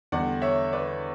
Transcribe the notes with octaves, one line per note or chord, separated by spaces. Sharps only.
E2 D3 G3 D5 F#5
C#5 E5
B4 D5